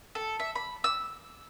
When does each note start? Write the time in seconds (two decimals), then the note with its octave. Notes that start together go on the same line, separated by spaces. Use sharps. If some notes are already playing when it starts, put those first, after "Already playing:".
0.15 A4
0.40 E5
0.55 B5
0.84 E6